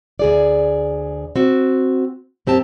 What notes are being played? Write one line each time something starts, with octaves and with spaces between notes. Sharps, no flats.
D2 G#4 D5
C4 F#4
F#2 C4 G4 A5